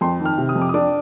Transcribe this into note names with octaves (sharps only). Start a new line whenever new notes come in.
F2 C6
D#3
F6
C3
D#6
F2
D6
D#6
D4 D6